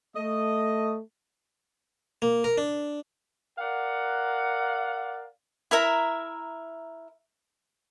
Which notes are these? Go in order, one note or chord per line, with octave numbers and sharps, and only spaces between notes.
A3 D#5
A#3
A#4
D4
A#4 D5 F5 F#5
E4 A#4 E5 A#5